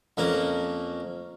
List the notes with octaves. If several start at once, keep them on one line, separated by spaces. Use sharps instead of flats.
F2 A#3 C#4